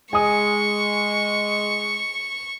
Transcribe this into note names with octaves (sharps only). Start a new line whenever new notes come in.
G#3 G#5 C#6 D#6